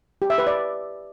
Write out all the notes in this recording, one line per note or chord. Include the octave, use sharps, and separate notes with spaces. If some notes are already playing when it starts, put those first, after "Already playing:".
G4
E5
B4
D5